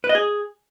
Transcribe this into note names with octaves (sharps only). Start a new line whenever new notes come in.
B4
D#5
G#4